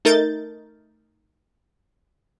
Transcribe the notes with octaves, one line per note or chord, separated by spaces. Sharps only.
A3 D#4 A#4 G6 A6